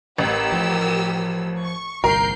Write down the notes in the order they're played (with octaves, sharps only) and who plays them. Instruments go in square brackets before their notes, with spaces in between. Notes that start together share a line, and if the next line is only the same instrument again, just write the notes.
[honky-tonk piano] A1 [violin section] G4 A#4 E6
[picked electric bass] F3
[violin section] C#6
[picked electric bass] G1 C2 [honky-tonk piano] A#4 [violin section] G6 C7